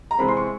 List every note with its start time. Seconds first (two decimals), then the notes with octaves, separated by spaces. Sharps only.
0.11 A#5
0.18 C3 E3 G#3 C4 B5
0.28 C6
0.37 C#6